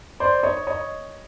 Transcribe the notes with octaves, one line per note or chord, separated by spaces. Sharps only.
C5 D5
C#5 D#5
C#5 D#5